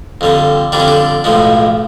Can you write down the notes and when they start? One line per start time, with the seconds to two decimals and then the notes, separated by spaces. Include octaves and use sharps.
0.21 F2 D3 G3
0.72 F2 D3 G3 D4
0.80 C#4
0.88 D4
1.24 B1 A2 F3 G#3